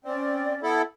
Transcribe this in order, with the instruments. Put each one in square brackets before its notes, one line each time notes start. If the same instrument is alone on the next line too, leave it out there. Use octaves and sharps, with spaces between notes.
[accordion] C4 [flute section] C#4 D5
[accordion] B3 E4 A4